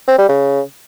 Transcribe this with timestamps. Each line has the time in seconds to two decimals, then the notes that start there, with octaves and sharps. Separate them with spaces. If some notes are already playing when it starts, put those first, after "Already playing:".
0.08 C4
0.18 G3
0.29 C#3